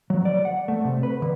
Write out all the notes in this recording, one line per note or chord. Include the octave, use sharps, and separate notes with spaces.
F#3
D5
F#5
A3
C3
B4
D3